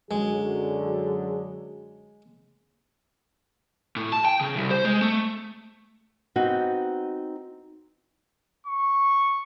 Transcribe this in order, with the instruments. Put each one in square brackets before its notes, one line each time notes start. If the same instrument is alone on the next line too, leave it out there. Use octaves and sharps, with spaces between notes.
[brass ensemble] F#2 D3 F#3 [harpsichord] G#3 [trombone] G#4
[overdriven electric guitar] A2
A5
G5
C#3
C2
C5
G#3
A3
[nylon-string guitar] B3 C4 D#4 F#4
[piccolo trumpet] C#6